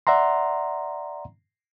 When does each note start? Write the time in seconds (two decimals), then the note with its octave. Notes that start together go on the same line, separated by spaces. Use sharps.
0.07 D5 E5 F#5 A#5 C6